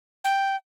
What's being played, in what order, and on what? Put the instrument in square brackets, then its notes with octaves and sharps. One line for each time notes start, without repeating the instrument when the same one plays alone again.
[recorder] G5